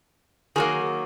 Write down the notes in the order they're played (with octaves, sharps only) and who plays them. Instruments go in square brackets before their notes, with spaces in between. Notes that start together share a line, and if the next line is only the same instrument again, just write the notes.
[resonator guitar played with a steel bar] D#3 F#3 A#3 G#4